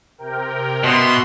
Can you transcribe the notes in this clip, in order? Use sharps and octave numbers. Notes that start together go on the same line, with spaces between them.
C3 A#4 G5
B2 B3 E5 C6